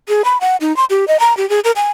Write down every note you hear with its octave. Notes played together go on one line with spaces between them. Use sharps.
G#4
B5
F#5
D#4
C6
G4
D#5
A#5
G4
G#4
A#4
G#5